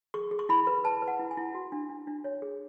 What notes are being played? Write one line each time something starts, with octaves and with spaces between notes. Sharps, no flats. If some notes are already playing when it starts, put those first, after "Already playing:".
G#4 C#6
G#4
C#6
E4 B5
B4
B4 A5
B4
F#5
E4
G#5
E4
F#4
D4
D4
D4
C#5
G#4